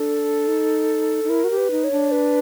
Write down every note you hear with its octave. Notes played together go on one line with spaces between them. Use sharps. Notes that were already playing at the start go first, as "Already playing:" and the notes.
Already playing: D4 A4
D#4
D#4
E4 A#4
F#4
G4
B4
D#4
C#5
D4
B4